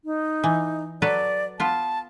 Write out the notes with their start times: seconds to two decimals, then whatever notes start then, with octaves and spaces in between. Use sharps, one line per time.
0.05 D#4
0.44 E3
1.02 F#3 A4 B4 D5
1.60 B3 F4 A5